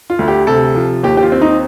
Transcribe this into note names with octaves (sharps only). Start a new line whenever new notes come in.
F4
D2
G4
C3 A4
F3
D#2 G4
G4
F4
C4
D#4